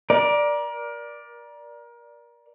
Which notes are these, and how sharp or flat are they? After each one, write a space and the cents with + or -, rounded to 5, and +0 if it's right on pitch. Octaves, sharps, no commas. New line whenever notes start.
A#4 +30 D5 +0